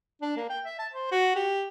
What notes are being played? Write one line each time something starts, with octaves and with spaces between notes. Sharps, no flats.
D4
A#3
G5
E5
A5
C5
F#4
G4